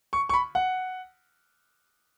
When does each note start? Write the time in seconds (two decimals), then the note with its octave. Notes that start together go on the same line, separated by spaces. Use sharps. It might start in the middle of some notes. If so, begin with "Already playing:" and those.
0.13 C#6
0.29 C#6
0.34 B5
0.55 F#5